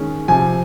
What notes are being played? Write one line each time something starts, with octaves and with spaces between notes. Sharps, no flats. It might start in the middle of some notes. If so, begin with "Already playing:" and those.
Already playing: D#3 G#3 C#4
C3 F3 C4 G#5